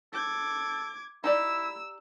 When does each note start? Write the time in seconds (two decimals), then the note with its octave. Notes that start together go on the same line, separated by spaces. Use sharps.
0.13 A4 D6 G#6
1.24 D#4 E4 G4 D5 E6